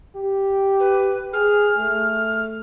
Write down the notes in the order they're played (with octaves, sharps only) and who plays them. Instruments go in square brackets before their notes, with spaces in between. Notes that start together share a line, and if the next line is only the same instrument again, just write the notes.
[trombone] G4
[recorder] B4
[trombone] G#4 [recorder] F6
[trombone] A3